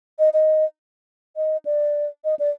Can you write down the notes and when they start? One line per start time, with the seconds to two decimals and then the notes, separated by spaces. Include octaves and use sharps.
0.19 D#5
0.33 D#5
1.36 D#5
1.65 D5
2.25 D#5
2.39 D5